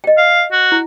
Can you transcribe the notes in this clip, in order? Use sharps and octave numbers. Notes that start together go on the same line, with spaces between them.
D#5 G5
F5
F#4
E4